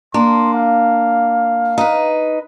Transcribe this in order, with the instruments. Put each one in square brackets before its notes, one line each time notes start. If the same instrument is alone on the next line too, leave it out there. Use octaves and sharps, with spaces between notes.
[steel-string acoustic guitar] A#3 D4 [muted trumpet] C6
[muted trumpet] F5
[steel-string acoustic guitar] D#4 B4